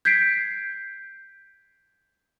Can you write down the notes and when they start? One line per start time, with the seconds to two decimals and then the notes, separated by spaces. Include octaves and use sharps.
0.05 G6 G#6 B6 C7 D7